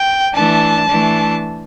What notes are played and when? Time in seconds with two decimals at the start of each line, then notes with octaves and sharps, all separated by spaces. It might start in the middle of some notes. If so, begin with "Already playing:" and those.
Already playing: G5
0.35 E3 A3 D4 A5
0.89 E3 A3 D4